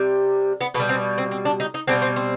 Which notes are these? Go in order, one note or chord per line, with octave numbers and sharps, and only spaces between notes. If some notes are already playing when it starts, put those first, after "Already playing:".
Already playing: C3 G3
B3
B2 B3
G3
C4
C4
C4
D4
D#4
D#4
B2 G3 C4
C4
C4